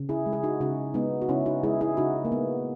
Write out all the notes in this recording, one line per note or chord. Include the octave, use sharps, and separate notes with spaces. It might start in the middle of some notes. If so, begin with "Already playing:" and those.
Already playing: C#3
E4 G#4
G#3
G#4
D#4 F#4
C#3 D#4 F#4
G#3 B3 D#4
F#4
C#3 C#4 E4
D#4 F#4
G#3 E4 G#4
E4 G#4
C#3 D#4 F#4
A#3
G#3 B3